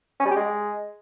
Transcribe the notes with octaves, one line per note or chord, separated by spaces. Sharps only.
C#4
G3
G4
G#3